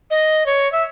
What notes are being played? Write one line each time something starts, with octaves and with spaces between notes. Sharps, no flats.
D#5
C#5
E5